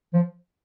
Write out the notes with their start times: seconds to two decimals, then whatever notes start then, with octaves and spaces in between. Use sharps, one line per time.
0.13 F3